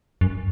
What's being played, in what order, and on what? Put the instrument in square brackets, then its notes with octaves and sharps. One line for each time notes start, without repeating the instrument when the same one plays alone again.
[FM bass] F#2